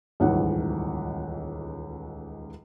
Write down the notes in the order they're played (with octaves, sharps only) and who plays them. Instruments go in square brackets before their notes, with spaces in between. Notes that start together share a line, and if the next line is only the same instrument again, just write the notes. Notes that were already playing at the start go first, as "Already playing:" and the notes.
[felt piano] D#1 C#2 G#2 E3 C#4 F#5